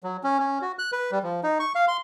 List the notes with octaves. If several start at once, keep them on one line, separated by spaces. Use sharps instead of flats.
F#3
C#4
C#4
F#4
F#6
B4
G3
F3
D#4
C#6
F5
C6